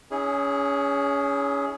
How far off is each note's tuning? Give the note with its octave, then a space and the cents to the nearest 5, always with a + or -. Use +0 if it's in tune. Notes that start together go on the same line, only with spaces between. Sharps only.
C#4 +25 E4 -40 G#4 -5